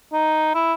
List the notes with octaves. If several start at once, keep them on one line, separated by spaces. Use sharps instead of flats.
D#4
E4